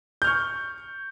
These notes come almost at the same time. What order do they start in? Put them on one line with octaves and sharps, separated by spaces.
G6 F6 C#6